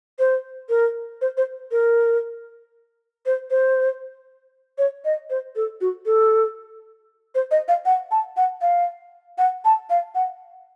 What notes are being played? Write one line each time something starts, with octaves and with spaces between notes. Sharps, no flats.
C5
A#4
C5
C5
A#4
C5
C5
C#5
D#5
C5
A4
F#4
A4
C5
D#5
F5
F#5
A5
F#5
F5
F#5
A5
F5
F#5